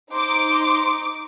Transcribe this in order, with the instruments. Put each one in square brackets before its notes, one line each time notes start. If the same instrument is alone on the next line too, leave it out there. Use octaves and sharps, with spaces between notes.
[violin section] D#4 D6 [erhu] C5